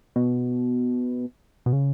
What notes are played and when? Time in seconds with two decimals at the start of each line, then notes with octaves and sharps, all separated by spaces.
0.16 B2
1.66 B2
1.73 C#3